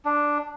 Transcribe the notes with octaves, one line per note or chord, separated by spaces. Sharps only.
D4